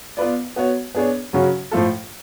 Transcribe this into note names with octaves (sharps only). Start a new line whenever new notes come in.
B3 F4 B4 D5
B3 F#4 C#5
B3 D4 G#4 C#5
C#3 F#3 C#4 F#4
A2 F3 A3 F4 A4